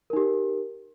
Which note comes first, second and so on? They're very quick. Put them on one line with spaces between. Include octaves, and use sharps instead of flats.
A#4 D#4 G4